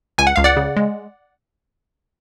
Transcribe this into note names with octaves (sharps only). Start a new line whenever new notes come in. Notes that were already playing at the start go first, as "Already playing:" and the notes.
C#2 G#5
F#5
C#2 F5
D5 F#5
C#3
G#3